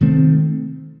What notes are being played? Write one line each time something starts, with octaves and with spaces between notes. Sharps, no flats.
C3 D#3 A3 C4